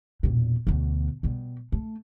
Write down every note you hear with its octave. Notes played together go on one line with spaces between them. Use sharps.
E1 A#2
D2 B2
B2 G3
A3